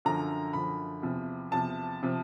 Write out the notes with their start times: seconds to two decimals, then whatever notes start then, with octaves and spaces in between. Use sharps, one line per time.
0.05 F#2 D3 F3 A#5
0.53 F#2 D3 F3 B5
1.02 E2 C3 F3
1.51 E2 C3 F3 A5
2.03 C3 F3